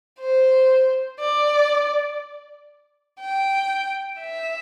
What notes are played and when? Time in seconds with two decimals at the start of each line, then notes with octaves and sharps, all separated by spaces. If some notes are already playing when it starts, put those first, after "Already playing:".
0.20 C5
1.20 D5
3.21 G5
4.21 E5